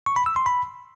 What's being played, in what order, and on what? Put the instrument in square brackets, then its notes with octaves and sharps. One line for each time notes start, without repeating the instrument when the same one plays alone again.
[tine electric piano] C#6
B5
E6
C6
B5